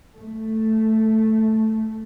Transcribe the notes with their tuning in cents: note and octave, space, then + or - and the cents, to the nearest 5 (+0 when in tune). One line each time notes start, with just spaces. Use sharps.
A3 +0